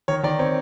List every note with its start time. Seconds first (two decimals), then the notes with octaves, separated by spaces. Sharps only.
0.08 D#3 C#5
0.23 D#3 D5
0.39 C4 C#5